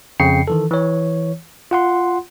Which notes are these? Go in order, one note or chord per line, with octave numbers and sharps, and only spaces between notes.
F2 C#3 G5 C7 C#7
D#3 E3 A4
E3 C#5
F4 F#5 C6